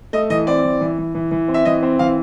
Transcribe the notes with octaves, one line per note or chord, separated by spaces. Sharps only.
A3 D#5
E3 D#5
C4 D5
E3
E3
E3
E3
E3
C4
E5
E3 D#5
C4
E3 F5